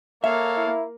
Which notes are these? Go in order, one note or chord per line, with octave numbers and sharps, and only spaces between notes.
A#3 A4 C#5 E5 F5
E4